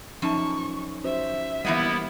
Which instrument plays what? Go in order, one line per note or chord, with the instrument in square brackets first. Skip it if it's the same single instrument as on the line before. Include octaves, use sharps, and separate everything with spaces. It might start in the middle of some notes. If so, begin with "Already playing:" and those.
[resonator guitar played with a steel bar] F#2 A5 [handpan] F3 C#4 D#4 [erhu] C#6
[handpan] C#4 F#4 C5 [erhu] E5
[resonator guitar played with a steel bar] E3 A#3 D#5 [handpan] G3 [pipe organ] B3 E4